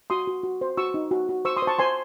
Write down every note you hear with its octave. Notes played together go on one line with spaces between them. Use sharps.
F#4 C6 D#6
F#4
F#4
C5
F#4 C#6 E6
D#4
F#4
F#4
C5 C#6 E6
C6 D#6
C5
A5 C#6
C5 G#5 C6